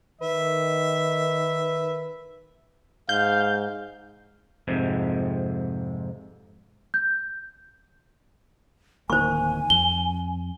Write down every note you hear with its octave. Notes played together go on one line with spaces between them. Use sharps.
D#3 B4 E5
G#2 F5 G6
F2 G#2 C3
G6
D1 D#3 A#3 C5 G#5 C#6
F2 G7